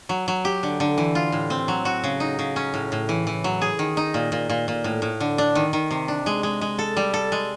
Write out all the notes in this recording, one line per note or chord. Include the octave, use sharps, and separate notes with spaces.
F#3
F#3
G4
D3
D3
E3
F4
A2
C4
F#3
F#4
C#3
D#4
C#3
C#4
A2
A2
E3
E3
F#3
G#4
D#3
D#4
A#2
A#2
A#2
A#2
A2
A2
D3
D4
D#3
D#3
C3
D4
G#3
G#3
G#3
A4
G3
A4
G#3